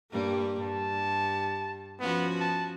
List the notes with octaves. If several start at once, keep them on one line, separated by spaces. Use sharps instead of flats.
G2 G3 A#3
G2 A5
F3 B3 C#4 F#4
A5